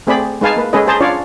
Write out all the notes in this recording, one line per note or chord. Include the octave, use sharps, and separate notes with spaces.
A3 C4 G#4 D5 B5
G#3 D#4 B4 F5 G#5 A5
A#3 B4
G#3 C#4 G#4 A4 B4 D#5
G#4 C5 A5 A#5
C#4 D4 F4 C#5 D5 F5